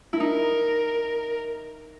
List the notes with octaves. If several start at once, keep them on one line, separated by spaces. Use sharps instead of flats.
E4
D#4 A#4